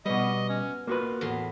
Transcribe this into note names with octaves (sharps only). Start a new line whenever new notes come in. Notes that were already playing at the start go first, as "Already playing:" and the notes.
B2 G3 B3 D#5
C#4
A#3 F4 F#4 B4
E2 A2 C6